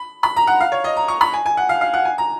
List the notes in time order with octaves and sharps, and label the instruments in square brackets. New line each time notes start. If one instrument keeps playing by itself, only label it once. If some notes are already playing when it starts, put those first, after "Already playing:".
Already playing: [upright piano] B5
B5
A#5
F#5
F5
C#5
D#5
A#5
C#6
B5
G#5
G#5
F#5
F5
F5
F#5
G#5
A#5